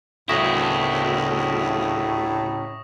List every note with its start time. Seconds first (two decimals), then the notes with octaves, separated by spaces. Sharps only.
0.29 D2 A2 C#3 E4 C#6 D#6 A#6